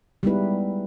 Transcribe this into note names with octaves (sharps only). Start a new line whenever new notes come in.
G3 G#3 B3 D#4 E4 B4